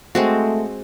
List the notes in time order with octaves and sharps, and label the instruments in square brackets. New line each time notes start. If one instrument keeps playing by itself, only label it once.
[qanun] G#3 C4 F#4 [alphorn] A3